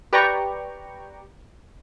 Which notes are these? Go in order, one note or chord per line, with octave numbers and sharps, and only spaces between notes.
G4 B4 D5 G5 A#5 C#6